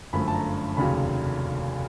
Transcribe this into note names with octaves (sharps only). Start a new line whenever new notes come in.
G1 F#2 D3 F3 A3 B5
A5
A#5
F1 D#2 C#3 F#3 B5